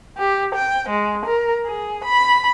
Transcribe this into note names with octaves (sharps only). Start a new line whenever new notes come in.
G4
G5
G#3
A#4
G#4
B5